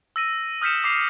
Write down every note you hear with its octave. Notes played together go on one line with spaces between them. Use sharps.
E6 A#6 D#7
D#6 F6 G6 B6 C#7 E7
D6 E6 C7 E7 F7